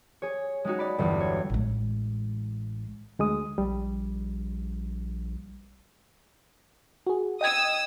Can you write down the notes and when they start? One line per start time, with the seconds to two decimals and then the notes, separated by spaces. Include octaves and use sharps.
0.22 G#4 C#5
0.65 G#3 C#4 D#4 F#4
0.79 D5 B5
0.98 G1 E2
1.20 C#5
1.50 A1 G#3
3.19 D2 G#3 D#6
3.58 A#1 G3
7.07 F#4 G#4
7.41 D#5 G5 D#6 E6 G#6